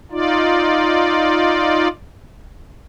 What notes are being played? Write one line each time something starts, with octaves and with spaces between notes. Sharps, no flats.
D#4 F4 D5